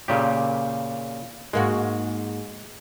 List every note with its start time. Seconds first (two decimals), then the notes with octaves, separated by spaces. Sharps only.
0.08 A#2 C#3 G4
1.53 G#2 G#3 A#3 F#4